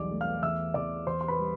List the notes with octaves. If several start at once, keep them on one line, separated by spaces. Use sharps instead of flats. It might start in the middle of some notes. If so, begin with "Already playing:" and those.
Already playing: B1 E2 G3 D5 D6
A3
F5 F6
E2 E5 E6
E2 D5 D6
E2 C5 C6
C6
B4 B5
G3